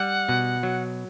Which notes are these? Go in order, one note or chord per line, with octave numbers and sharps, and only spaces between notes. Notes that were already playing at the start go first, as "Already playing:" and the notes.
Already playing: G3 F#5
B2
F#3